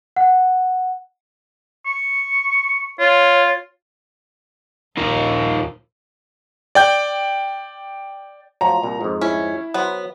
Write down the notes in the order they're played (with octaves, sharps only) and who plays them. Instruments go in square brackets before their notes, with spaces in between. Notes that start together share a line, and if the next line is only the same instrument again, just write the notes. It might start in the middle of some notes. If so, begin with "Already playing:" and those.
[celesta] F#5
[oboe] C#6
[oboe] F4 [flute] C#5
[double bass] A#1 D#2 [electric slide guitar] D#4 F4 A#4
[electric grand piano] D5 G5 G6
[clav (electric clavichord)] F3 F#3 [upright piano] A#5
[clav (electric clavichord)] C2 A#2
F2 G#2
[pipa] C#4 [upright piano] E4
[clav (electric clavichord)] F#3 C5 [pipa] B3